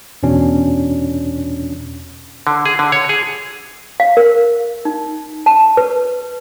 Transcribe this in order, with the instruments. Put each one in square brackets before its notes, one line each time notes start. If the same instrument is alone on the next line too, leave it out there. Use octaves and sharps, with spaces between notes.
[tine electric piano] E2 B2 C#4 D4
[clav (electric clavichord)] D3
G#4
D3
C#5
G#4
[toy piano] F5
A#4
D#4
A5
B4